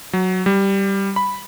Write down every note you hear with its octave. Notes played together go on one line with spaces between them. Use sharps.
F#3
G3
B5